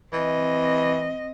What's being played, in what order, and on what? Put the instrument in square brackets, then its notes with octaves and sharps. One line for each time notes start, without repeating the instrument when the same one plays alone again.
[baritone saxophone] E3 [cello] C4 D#5